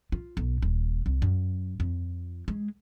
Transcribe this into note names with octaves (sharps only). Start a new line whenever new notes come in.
F4
B1
D#1
C2
F#2
F2
G#3